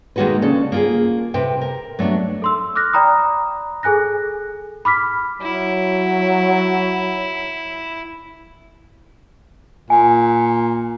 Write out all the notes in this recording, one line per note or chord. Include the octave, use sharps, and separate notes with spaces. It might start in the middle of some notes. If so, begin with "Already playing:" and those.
D#3 G#3 A#3 F#4 A4 B4
C#3 D4 A4
A#3 F4 G#4
C3 A4 B4 G5
A#4
F#3 A3 B3 D4 F#4
A4 C6 E6
D6 F6 F#6 A#6
D5 G5 A#5 B5 D#6
G#4 A4 G#5 F#6 A#6
B5 D6 F6 B6
F#3 E4
A#2 G#5